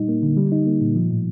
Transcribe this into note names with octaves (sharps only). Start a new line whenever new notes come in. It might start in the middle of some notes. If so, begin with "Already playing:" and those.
Already playing: A#2 G3 D#4
A#3
D3
G3
D#4
A#3
A#2
F3
A2